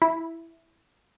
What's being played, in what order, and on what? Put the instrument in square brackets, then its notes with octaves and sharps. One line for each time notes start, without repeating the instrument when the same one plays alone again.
[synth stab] E4